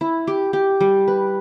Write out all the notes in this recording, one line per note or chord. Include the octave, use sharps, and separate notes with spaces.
E4
G4
G4
G3
B4